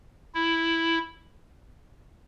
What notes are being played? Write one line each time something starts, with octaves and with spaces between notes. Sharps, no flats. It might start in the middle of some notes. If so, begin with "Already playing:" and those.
E4